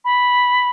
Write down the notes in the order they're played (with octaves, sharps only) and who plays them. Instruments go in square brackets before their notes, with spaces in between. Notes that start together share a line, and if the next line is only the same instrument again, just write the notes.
[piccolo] B5